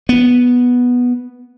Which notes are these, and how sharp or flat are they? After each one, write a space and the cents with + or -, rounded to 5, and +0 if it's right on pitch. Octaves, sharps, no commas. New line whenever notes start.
B3 -5